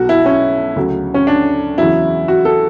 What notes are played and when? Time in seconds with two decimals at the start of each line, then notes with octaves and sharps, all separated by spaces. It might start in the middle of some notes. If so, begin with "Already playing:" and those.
Already playing: B1 B2 F#3 F#4
0.09 E4
0.26 C#4
0.76 D2 C#3 F#3
1.14 C#4
1.27 D4
1.78 E2 C#3 F#3 E4
2.28 F#4
2.45 A4